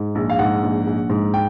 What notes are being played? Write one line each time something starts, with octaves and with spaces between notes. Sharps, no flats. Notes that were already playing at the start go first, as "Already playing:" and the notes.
Already playing: G#2
A#1
F5
G#2 F#5
A#1
A#1
G#2
G5